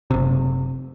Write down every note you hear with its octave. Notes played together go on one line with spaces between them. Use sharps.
F#1 C3